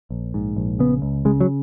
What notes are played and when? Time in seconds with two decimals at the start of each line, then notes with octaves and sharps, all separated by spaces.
0.11 A#1
0.34 G#2
0.57 A#1
0.79 C#3 B3
1.02 C#2
1.25 C#3 G#3
1.41 F#3